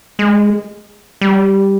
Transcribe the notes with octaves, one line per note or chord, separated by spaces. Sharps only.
G#3
G3